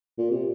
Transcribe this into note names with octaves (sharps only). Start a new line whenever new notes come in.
A#2
C3